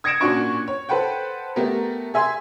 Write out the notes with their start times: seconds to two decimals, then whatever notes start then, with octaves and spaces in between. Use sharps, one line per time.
0.04 D#6 G#6 A#6 C#7 D7 E7
0.20 A#2 C#4 D4 F#4 C#6 D7
0.68 C#5
0.89 A4 B4 C5 F#5 G5
1.56 A3 B3 G4 A#4
2.14 G#4 E5 G#5 C6